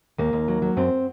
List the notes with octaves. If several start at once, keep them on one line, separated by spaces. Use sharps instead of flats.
D#2 A#3
D#2
F#3
F#3
F#2 C4